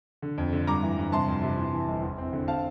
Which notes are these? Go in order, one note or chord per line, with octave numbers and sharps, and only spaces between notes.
D3
F2
D3
G2 A#5 D6
E3
G2
C3 A5 C6
F2
C3
E3
E3
G1
E2
C4
D3
C4 F5 A5